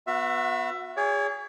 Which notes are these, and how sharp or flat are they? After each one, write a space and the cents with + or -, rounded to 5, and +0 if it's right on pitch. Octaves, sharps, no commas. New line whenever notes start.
B3 +0 F#4 -30 E5 +20
G#4 -20 C#5 +35 D6 -40